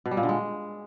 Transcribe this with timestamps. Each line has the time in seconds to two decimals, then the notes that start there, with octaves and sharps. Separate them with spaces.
0.06 B2
0.11 G3
0.17 A#2
0.23 D3
0.29 G#3